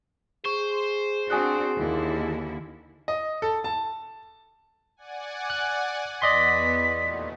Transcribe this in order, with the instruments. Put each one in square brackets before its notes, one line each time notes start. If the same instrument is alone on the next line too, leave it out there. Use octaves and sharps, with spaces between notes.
[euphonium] G#4 [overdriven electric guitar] C5 [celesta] C#6
[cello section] C4 D4 F#4 [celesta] G#5 D#6 F#6
[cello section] D#2 D3 E4
[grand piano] D#5
A4
A5
[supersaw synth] D5 F#5 G#5
[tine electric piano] F#6
[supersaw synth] E2 B3 [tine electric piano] D5 D#5 C6 [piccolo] B6
[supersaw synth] D#2 A#2 A3